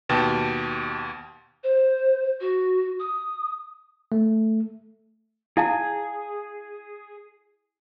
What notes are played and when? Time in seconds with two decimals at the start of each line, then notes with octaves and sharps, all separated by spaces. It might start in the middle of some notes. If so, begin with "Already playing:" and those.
0.09 D#2 B2 G4 G5 A5 A6
1.64 C5
2.40 F#4
3.00 D#6
4.12 A3
5.57 E4 G#4 F5 A5